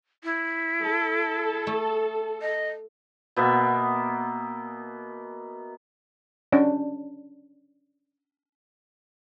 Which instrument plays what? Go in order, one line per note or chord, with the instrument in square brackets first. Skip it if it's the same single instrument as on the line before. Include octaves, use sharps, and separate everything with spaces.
[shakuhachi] E4
[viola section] A4
[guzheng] A3
[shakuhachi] D#5
[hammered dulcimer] B2 A#3 B3 E5
[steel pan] C#4 D4